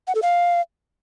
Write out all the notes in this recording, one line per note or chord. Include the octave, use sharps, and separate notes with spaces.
F#5
A4
F5